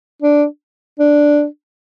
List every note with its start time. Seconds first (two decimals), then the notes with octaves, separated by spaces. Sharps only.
0.22 D4
0.99 D4